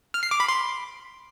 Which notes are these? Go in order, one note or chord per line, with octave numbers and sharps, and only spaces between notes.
F6
C7
D6
B5
C6